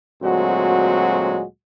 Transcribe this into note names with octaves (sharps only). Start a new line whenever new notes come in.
D2 A#2 F#3 G#3 C4 F#4